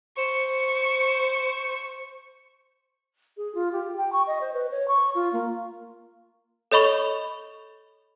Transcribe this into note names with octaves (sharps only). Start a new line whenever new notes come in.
C5 C#6
G#4
F4
G4
G5
C#6
D#5
C5
B4
C#5
C#6
F4
A#3
A4 C#5 D#5 B5 C#6 F7